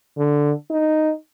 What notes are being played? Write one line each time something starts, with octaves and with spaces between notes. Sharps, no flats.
D3
D#4